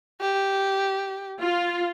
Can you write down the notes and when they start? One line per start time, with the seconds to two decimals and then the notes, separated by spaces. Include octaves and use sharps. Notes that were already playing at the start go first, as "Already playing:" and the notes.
0.21 G4
1.41 F4